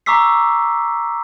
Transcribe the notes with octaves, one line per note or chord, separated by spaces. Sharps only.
A#5 C#6 D6 E6 B6 C7